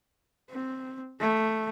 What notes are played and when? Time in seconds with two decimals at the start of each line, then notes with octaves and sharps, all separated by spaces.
0.50 C4
1.20 A3